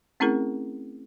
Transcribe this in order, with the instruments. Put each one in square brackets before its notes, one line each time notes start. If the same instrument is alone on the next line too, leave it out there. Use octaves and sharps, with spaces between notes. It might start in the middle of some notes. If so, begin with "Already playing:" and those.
[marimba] A3 C4 C#4 E4 G#4 A#4